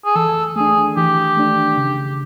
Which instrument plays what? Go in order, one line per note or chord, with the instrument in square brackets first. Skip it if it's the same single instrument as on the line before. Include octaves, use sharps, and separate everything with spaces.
[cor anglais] G#4
[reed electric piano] E3 [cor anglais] A4
[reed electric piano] A3 D4 [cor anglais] G#4
[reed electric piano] E3 [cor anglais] G4
[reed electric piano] A3 D4
C#3